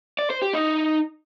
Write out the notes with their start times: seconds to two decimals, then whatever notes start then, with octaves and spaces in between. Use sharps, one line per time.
0.19 D5
0.30 C5
0.42 G4
0.53 D#4